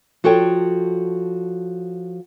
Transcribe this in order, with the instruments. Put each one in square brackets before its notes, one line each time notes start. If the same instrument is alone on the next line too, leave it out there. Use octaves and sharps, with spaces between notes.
[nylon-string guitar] F3 F#4 A4 C#5 G5